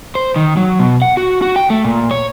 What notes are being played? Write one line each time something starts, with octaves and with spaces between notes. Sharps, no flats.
C5
D#3
F#3
B2
F#5
F#4
F#4
G5
A3
A#2
C#5